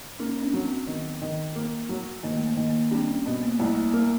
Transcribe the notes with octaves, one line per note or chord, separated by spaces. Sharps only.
A#3 C#4 D#4
C#4
C4 D4
F#3
C4
D#3 B3
D#3
A#3
F#3
D#3 A#3
A3
A#3
D#3
A#3
G3 C4 D4
C#4
B2 B3
A#3
C2 A3
A#3
A#3